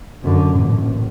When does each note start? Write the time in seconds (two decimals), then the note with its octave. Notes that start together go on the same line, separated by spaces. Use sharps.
0.24 F#2 D3
0.56 A1 A#2